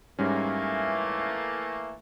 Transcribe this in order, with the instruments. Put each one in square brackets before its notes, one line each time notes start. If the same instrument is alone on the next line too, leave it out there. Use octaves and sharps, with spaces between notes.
[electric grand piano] G#2 G3 C#4 [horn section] E3 A3 A#3